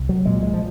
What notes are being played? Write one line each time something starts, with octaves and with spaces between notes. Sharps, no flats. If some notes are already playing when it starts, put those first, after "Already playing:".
Already playing: C2
F#3
A#2 G#3
G#3
F3